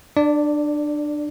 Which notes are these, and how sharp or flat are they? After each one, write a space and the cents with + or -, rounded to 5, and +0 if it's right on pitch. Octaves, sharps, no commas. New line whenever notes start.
D4 +25 D5 -5